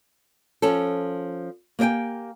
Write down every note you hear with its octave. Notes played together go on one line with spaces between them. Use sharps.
F3 C#4 A4
A#3 G4 D#5 G5 G#5